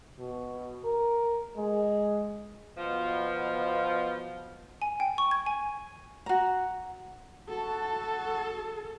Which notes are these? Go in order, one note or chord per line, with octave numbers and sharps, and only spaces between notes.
B2
A#4
G#3
B2 F3
G#5
G5
C#6
G#6
G#5
F#4 A#5
F#4 A4 A5